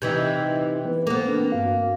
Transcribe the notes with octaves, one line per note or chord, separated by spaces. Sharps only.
C3 E3 D#4 G6 G#6 B6
E3 B3 B4
A#3 B3 A4 C5
C4 D4
G2 F#4 F5